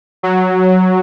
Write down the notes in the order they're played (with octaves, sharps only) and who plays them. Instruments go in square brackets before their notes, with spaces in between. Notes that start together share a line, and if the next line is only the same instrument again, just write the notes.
[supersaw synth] F#3